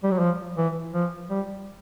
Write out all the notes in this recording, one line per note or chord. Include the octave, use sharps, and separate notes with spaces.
G3
F#3
F3
E3
F3
G3